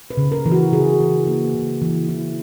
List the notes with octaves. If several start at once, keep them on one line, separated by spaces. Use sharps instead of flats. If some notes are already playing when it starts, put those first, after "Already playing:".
B4
C#3
A#4
E3
F#4
C#3 G#4
E3
A#3
C#3
E3
E4